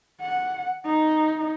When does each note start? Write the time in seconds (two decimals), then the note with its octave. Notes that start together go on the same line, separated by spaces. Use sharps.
0.21 F#5
0.86 D#4